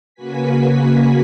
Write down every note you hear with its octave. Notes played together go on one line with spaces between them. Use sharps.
C#3 A#3 F#4 B4 G#5 B6